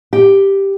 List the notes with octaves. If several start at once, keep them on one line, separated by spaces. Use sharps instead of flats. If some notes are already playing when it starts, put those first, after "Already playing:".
G4